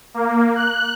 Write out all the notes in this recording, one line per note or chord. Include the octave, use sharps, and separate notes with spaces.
A#3
F#6